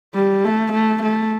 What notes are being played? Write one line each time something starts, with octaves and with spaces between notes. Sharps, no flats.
G3
A3
A3
A3